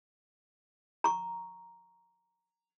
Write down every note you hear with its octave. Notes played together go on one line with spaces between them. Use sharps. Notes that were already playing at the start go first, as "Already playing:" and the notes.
A#5 C#6